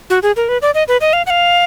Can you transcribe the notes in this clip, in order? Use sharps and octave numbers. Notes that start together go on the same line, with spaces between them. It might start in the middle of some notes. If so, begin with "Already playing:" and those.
F#4
G#4
A#4
B4
D5
D#5
B4
D#5
F5
F#5
F5